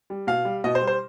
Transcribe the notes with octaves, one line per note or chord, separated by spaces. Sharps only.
G3
B2 F5
G3
B2 D#5
C5
G3
C5